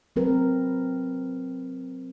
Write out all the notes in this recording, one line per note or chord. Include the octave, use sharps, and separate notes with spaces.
F#3 C4 A#4 B4